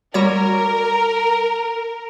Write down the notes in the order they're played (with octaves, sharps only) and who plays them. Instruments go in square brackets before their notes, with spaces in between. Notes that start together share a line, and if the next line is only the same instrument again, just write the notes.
[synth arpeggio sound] G3 F#4 C#5 [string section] A#4